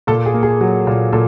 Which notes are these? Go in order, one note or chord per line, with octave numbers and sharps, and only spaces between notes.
A#2 A4
G#4
A#3
G#4
F#3
A#2
A#2 A4